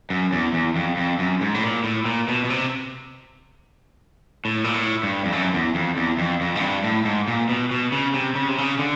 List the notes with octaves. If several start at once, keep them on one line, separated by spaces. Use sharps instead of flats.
F#2
E2
E2
F2
F2
F#2
G#2
A2
A#2
A2
A#2
B2
B2
C3
A2
A#2
A2
G2
F2
F#2
E2
F2
E2
F2
F2
G#2
G2
A2
G#2
A#2
B2
B2
C#3
C3
C#3
C3
C#3
D3